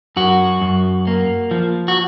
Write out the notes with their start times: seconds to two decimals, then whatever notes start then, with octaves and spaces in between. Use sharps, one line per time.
0.16 F#2 F#4
0.62 F#2
1.07 A#3
1.51 F3
1.88 F#4